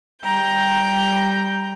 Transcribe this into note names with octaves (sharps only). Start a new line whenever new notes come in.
G3 G5 A#5 G6